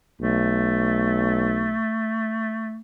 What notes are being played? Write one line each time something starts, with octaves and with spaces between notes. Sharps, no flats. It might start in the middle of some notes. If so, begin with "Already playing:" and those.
B1 A3